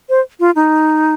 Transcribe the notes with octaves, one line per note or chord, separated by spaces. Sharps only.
C5
F4
D#4